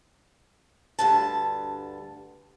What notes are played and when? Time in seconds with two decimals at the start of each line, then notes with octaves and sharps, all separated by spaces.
0.99 D2 G2 A5